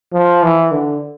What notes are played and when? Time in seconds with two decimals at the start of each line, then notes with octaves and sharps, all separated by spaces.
0.13 F3
0.43 E3
0.71 D3